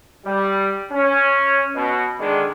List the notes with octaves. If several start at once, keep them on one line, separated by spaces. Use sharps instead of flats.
G3
C#4
B2
D3 D#3 G#3 D4